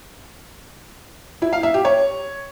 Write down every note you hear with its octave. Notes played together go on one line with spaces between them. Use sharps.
E4
F5
E5
G4
C#5